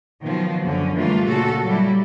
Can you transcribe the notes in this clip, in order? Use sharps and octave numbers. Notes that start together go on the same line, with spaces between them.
B2 D#3 F3 F#3
F#2 D3 C#4
E3 G3 A3 A#3 D4 F4
A#2 C#3 F#4 A4
F#3 G3 E4